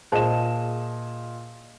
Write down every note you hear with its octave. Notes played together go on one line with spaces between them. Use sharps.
A#2 G#4 C5 D#5 A5 E7